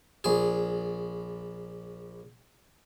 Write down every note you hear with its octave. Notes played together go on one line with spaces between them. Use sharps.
A#1 G#4